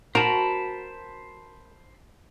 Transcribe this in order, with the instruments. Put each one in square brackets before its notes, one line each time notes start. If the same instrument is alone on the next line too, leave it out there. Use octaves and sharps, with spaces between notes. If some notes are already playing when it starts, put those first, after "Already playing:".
[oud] F#4 [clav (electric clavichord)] A#4 [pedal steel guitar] C5 A5 B5